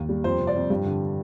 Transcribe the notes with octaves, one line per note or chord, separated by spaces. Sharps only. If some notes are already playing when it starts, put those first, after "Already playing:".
Already playing: D#2 A#3
G3
F2 C5
C3
D5
F2
G2 G4
D3